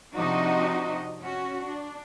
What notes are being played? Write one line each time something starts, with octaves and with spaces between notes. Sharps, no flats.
C3 F3 D4 D#4 F#4 D#5
C#4 F#4
D4